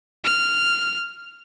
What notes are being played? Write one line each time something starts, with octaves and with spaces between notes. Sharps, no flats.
F6